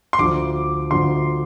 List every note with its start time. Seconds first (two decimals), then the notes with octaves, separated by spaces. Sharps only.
0.13 C6
0.19 D2 D3 F3 D6
0.91 D2 D3 F3 C6